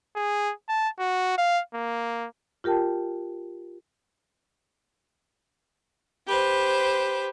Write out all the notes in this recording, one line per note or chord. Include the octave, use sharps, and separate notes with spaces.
G#4
A5
F#4
F5
A#3
F4 G4 A#4 G5 A5
G4 B4 C5